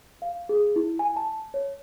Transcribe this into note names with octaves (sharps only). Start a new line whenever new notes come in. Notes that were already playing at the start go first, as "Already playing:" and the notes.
F5
G#4
E4
G#5
A5
C#5